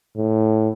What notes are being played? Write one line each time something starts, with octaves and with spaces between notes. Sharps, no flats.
A2